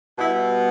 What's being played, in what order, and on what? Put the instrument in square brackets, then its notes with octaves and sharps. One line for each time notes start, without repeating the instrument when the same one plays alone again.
[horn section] B2 G3 B3 E4